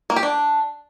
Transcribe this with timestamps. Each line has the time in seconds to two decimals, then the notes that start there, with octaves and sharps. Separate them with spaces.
0.10 A#3
0.16 G4
0.23 D4